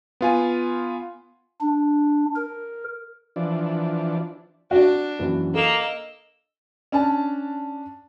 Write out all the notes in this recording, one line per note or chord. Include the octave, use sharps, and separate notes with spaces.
B3 F4 G#5
D4
A#4
E3 F3 D4
D4 F#4
A#1 F#2 E3
A#3 A4 D#5 E6
C#4 D4 A5